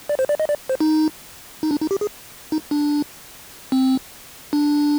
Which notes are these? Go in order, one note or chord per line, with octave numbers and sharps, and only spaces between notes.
D5
C5
D5
D#5
D5
C5
D#4
D#4
D4
D#4
G4
G#4
D#4
D4
C4
D4